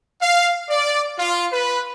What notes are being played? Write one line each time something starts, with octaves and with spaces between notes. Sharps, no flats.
F5
D5
F4
B4